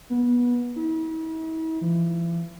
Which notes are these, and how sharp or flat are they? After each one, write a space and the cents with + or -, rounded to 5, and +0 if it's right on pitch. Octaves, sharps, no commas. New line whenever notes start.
B3 -20
E4 -45
E3 +40